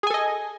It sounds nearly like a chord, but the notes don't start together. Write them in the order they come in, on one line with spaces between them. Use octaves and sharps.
G#4 G#5 A4 D#5